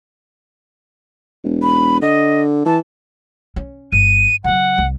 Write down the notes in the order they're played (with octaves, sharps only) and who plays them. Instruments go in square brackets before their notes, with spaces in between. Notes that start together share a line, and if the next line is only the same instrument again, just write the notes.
[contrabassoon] E1
[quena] B5
[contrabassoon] D3 [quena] D#5
[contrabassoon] E3 [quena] A5
[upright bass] C#4
[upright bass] G1 [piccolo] D#7
[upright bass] C#3 F#3 [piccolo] F#5
[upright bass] C2